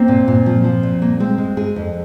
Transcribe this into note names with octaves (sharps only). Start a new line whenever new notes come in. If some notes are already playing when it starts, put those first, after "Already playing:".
Already playing: A#3 C4
A#2
A#2
F3
F3
A#2
A#3
G#3 C4
G#3
G#3 G#4
F2